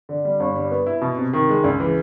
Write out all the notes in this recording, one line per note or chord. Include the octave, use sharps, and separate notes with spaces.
D3
G3
G1
G3
B3
E4
B2
C3
D#3
G#3
C#2
E3